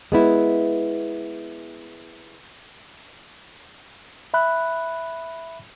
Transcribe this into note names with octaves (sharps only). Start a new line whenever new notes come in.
G#3 B3 E4
E5 B5 F#6